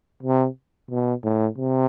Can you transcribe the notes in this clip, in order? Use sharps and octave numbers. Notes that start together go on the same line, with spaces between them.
C3
B2
A2
C3